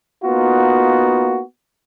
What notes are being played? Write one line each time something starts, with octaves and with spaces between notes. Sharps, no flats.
A#3 B3 D#4 F4 F#4